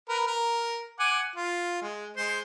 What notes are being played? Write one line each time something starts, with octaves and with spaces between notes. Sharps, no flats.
A#4 B4
A#4
F#5 G#5 D6
F4
G#3
G#3 C5 C6